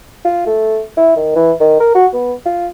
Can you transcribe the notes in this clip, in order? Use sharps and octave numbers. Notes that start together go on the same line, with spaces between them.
F4
A3
E4
D#3
E3
D#3
A#4
F#4
B3
F4